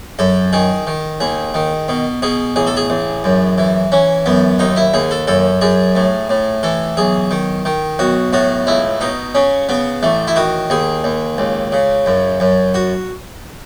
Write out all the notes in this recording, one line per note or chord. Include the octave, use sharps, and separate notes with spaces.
F#2 A4
D#3 G#4
D#3
D#2 G#4
D#3
B2
B2 G#4
A1 G#4
A4
G#4
A1
F#2
E3
E3 C#4
F#2 B3
D#2 D#4
E4
D#2 G#4
A4
F#2 A4
F#2 G#4
A2
A2
E3 A4
B1 G#4
D#3
D#3
B1 F#4
A2 F#4
C#2 E4
B2 D#4
C#3 C#4
C#3 B3
A1 A3
E4
D#3 F#4
D#2 G#4
D#2
C#2
C#3
F#2
F#2
F#4